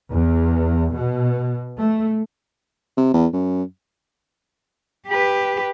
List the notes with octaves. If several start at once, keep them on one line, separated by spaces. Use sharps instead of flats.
E2
B2
A3
C3
E2
F#2
G4 B4